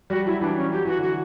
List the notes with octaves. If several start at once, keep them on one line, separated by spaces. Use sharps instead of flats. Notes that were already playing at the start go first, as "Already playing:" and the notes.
G3 F#4
F#3 E4
E3 D4
C#4
F#3 G4
E3 F#4
D3 F#4